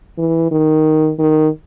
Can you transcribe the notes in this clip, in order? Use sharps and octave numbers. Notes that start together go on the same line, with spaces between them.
E3
D#3
D#3